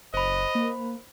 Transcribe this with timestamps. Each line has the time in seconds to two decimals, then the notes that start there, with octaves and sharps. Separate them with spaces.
0.14 F#1 C5 D#5 B5
0.55 A#3